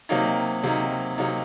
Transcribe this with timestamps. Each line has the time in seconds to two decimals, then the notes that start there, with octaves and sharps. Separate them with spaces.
0.09 C3 F#3 A#3 D#4
0.63 C3 F#3 A#3 D#4
1.18 C3 F#3 A#3 D#4